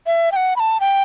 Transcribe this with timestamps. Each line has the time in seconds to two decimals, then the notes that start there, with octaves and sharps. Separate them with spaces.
0.07 E5
0.32 G5
0.36 F#5
0.56 B5
0.60 A5
0.80 G5